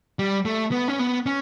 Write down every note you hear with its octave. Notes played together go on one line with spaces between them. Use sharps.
G3
A3
B3
C#4
B3
C#4